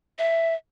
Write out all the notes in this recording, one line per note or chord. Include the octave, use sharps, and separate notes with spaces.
E5